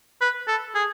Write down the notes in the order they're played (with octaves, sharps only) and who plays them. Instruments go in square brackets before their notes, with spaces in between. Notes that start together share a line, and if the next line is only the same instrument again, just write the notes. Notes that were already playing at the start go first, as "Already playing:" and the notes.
[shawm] B4
A4
G#4